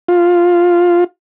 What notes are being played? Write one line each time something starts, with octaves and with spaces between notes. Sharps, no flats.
F4